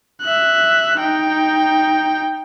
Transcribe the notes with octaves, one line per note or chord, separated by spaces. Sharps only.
E5 F#6
D#4 G5